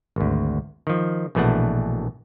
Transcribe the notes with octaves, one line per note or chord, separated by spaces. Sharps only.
G#1 D2
D#3 F3
A#1 B2 E3 A3 D4 F#5